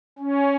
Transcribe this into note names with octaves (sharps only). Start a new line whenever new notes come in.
C#4